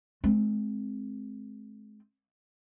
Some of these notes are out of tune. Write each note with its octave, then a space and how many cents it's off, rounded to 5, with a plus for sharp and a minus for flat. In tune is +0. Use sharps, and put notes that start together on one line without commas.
G#3 +35 C4 +0